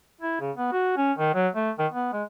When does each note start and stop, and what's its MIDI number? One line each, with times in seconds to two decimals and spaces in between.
0.21 0.36 64
0.41 0.51 49
0.57 0.70 59
0.72 0.95 66
0.97 1.12 61
1.18 1.31 51
1.34 1.48 54
1.55 1.71 57
1.79 1.87 51
1.92 2.13 59
2.13 2.24 56